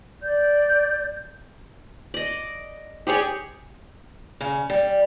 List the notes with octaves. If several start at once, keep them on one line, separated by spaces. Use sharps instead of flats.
D5 G6
D5 D#5
G4 G#4 C#5 D5
C#3
G3